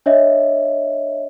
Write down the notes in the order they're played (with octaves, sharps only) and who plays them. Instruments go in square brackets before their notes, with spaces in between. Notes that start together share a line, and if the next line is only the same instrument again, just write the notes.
[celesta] D4 C#5 D#5 E5